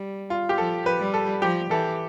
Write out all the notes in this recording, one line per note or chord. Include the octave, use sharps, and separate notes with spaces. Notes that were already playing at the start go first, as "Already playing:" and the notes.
Already playing: G3
F4
G4
F3 A4
B4
G3
A4
F3 G4
E3 A4